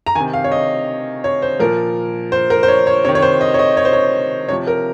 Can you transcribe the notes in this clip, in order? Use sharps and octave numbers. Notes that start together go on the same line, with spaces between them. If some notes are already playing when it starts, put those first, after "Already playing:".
A#5
C3 D#3 G#5
F5
C#5
D#5
C#5
C5
A#2 F3 A#4
C5
A#4
C5
C#5
C#5
C3 D#3 C#5
C#5
C5
D#5
C#5
D#5
C#5
C5
C#5
C3 F3 C#5
A#4